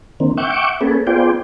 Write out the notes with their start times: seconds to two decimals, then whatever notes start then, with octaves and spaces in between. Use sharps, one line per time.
0.20 D3 D#3 A#3 C4
0.37 E5 F#5 G5 C#6 D6
0.81 A#3 C#4 G#4 A4 B4
1.07 B3 F4 G#4 C5 D5 G5